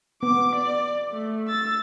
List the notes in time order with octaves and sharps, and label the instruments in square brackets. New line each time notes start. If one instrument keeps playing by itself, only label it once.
[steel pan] B3 [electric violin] D6
[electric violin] D5
A3
E6 A6